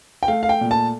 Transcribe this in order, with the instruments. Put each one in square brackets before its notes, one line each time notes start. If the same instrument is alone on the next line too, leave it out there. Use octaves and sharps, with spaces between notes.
[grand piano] G5
A3 F5
F5
G5
A#2
A5